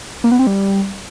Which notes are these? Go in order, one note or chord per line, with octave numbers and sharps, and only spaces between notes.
A#3
B3
C4
G3